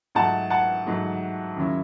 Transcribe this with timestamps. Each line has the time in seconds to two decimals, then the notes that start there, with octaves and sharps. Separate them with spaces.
0.15 G#2 F#3 A3 F#5 A5
0.50 F#5 A5
0.86 G#2 F#3 A3
1.56 D#2 C#3 F#3 C#4 E4